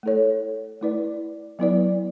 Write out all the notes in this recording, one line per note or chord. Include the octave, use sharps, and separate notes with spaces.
A3 E4 A4 C#5
A3 E4 B4 D5
F#3 B3 E4 B4 D5